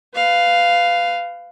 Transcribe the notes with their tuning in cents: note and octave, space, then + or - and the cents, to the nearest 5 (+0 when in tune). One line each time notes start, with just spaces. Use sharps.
B4 +20 F5 +0